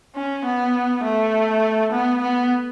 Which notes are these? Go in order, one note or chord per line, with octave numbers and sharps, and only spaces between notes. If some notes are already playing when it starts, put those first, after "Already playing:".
C#4
B3
A3
B3
B3